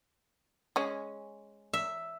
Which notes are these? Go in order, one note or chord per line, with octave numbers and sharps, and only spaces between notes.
G#3 C#4
E5